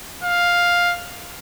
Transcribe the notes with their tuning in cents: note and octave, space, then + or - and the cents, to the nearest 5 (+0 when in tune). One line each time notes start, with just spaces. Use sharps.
F5 +5